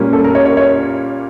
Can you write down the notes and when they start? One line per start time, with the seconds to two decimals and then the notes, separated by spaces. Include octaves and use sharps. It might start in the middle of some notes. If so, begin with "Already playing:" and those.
Already playing: A#2 G3 A#3 C#4
0.13 A4
0.24 A#4
0.35 C#5
0.46 C#5
0.57 C#5